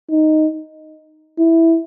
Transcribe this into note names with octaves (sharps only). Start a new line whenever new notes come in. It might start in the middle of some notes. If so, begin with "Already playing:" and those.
D#4
E4